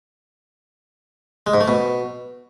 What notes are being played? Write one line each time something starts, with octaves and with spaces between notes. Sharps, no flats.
G#3
G#2
A3
B2